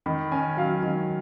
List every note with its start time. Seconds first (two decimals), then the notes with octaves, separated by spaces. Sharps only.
0.06 D#3 B5
0.32 C#4 G#5
0.57 F#3 F5
0.83 D#3